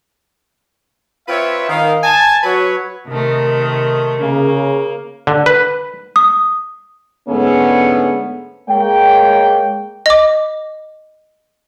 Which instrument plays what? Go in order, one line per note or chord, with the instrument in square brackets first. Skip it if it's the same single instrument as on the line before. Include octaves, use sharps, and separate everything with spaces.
[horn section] C4 F4 B4 C#5 E5
D#3 F5
G#5 A5
F#3 F#4 B4 C#5
[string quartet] C3 D#3 A3
[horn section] C#3 [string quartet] A#3
[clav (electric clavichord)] D3
B4
[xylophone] D#6
[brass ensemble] G#2 D3 A3 B3 C#4 G#4
G#3 A#3 C#5 G5
[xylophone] D#5 D6